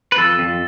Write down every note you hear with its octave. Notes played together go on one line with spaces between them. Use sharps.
B4
F2 A4
F2